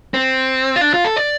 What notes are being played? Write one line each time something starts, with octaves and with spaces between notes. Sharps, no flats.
C4
F4
D4
F4
A4
D5